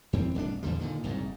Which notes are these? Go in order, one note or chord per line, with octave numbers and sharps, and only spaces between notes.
F2 E3 C4
D1 C2 C3 D4
E2 A#2 D3 G3
A#2 D3 D#3
F#1 C2 G#2